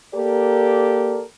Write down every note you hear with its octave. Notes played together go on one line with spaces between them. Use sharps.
A#3 G4 A4 A#4 D5